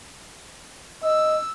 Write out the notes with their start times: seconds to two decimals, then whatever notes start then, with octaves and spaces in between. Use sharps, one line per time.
1.03 D#5 E6